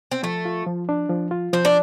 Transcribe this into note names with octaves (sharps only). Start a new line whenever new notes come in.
C4
F3 A3
F4
F3
D4
F3
F4
F3 C4
D4